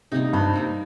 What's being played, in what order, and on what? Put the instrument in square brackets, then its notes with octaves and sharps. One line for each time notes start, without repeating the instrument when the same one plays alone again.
[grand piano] C3 [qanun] G3 A#3 D#4
[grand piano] G2 [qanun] C3
[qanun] G3 A#3 D#4